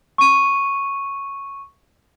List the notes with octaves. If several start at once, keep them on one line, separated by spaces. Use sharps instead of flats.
C#6 D#7